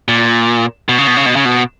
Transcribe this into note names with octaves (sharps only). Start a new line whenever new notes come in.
A#2
B2
C#3
B2
C#3
B2
C#3
B2